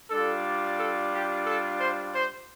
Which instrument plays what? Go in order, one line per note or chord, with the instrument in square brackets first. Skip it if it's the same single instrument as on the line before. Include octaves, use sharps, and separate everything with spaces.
[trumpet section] G3 D4 F4 A4
A4
G4
A4
C5
C5